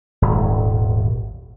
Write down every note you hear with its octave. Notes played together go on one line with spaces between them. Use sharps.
D#1 G#1